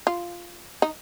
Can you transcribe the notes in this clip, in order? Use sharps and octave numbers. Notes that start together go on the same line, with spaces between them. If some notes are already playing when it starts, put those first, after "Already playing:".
F4
D#4